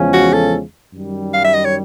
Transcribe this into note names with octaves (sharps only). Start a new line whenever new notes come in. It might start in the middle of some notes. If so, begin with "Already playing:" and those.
Already playing: E2 C#3 F3 G#3 C#4
F#4
A4
F#2 D#3 G3
F5
E5
D#5
C#5